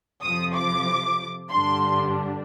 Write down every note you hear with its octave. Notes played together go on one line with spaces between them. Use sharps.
F2 C3 F3 D#6
D6
G2 D3 G3 D4 C6